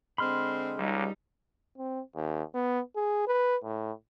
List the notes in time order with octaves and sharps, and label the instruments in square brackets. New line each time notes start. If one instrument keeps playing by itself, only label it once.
[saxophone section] D3 G#3 C4 [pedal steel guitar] B5 C6 F6
[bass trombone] C#2 [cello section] G3 D#4
[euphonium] C4
D#2
B3
G#4
B4
A2